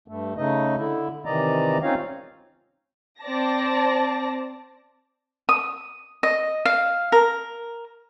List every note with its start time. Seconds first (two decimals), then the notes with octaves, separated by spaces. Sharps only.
0.08 G2 A3
0.37 C#3 A3 D#4 D#5
0.77 D3 E4
1.25 C3 D#3 E3 D5 D#5 A#5
1.83 C4 C#4 D#4 F4 C#5 F5
3.22 C4 D5 A5 A#6
5.49 D#6
6.23 D#5
6.65 F5
7.12 A#4